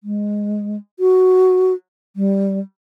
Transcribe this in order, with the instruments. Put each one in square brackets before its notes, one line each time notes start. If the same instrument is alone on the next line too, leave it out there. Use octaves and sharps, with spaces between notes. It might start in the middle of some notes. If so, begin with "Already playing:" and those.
[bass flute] G#3
F#4
G3